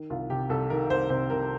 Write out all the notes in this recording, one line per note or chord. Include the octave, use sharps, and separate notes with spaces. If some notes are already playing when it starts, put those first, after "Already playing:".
Already playing: D#3
C2 F4
C3 G4
C2 A4
D#3 A#4
C2 C5
C3 C5
C2 A#4